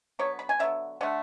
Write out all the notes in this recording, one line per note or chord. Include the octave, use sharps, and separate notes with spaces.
D3 F#3 B3 C#5
B5
G#5
D3 F#3 B3 E5
D3 A3 F#5